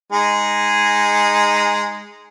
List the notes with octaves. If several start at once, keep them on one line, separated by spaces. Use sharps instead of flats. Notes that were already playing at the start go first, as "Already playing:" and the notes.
G#3 D#4 G#4